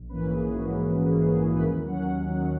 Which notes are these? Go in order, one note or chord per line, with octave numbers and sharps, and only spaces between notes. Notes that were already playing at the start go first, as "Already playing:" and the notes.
Already playing: A#1
G#2 E3 A#3 C#4 B4
A#1 G#4
G#2 E3 A#3 C#4 F#4
A#1
G#2 E3 A#3 C#4
A#1 G#4
G#2 E3 A#3 C#4
B4
D#2 A#4
D#3 F#3 C#4 F#5
D#2
D#3 F#3 C#4